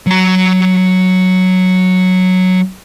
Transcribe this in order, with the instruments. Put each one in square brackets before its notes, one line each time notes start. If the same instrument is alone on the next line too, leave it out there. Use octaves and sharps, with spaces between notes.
[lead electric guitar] F#3 A#5